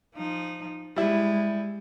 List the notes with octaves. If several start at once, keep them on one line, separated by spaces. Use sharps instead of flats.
F3 D#4
G3 G#3 E4